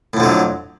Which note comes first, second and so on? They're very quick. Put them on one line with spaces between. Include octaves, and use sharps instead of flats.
A2 F2 D3 F#3